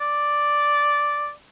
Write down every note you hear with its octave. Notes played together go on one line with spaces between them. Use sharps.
D5